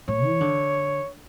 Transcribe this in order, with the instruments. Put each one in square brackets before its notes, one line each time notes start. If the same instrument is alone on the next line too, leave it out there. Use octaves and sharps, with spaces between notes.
[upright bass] A2 [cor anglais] C#5
[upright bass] E3
D3